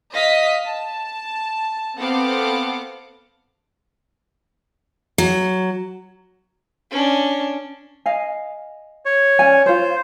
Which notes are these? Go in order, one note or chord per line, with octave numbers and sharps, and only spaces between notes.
D#5 F5 D#6 B6
A5
B3 C4 A4 F5 F#5 D6
F#3
C#4 D4
D#5 F5 G#5
C#5
C#4 D5 G#5
F4 C5 C#5